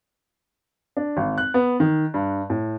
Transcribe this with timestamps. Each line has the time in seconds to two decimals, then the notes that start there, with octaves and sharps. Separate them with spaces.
0.97 D4
1.17 G#1
1.38 F#6
1.54 B3
1.80 D#3
2.14 G2
2.50 A2